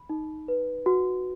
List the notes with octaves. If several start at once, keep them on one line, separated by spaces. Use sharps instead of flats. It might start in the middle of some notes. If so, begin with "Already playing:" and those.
Already playing: B5
D#4
B4
F#4